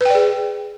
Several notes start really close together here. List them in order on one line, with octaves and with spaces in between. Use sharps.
B4 G5 D5 G#4